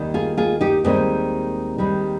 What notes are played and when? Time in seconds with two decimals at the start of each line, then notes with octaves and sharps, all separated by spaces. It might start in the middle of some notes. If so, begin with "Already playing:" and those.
Already playing: D#2 D#3 G3
0.14 F4 G#4
0.37 F4 G#4
0.61 D#4 G4
0.84 D#2 D#3 G3 G#3 C4
1.78 D#2 D#3 G3